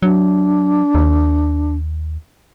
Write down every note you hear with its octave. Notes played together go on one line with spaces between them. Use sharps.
F#3 D4
D#2